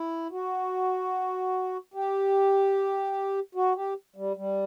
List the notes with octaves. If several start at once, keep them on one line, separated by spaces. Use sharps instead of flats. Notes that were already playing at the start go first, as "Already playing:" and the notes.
Already playing: E4
F#4
G4
F#4
G4
G3
G3